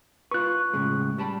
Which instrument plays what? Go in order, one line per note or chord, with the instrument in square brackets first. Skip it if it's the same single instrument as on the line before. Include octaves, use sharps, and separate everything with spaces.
[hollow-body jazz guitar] F4 B4 [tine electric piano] C#6 F#6
[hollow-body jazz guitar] A2 C#3 G#3
G3 A5 B5